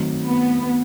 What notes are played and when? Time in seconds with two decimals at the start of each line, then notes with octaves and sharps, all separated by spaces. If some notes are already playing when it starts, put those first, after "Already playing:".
Already playing: D#3 F#3 A3 C4 D#4
0.26 B3